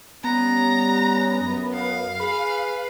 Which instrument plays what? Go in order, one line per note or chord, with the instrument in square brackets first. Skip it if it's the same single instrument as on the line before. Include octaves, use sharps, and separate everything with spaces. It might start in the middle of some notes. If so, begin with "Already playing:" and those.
[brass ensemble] G3 C#4 [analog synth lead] B3 [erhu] A#5
[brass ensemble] F#2
[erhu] F5
[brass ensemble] G#4 [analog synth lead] B4